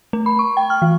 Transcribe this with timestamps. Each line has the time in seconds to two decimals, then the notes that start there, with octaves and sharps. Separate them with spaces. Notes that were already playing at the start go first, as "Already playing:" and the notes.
0.13 A3
0.26 B5
0.39 C#6
0.57 G5
0.70 F6
0.82 E3